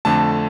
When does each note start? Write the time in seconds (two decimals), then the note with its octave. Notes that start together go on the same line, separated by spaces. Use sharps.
0.05 F2 D3 A3 A5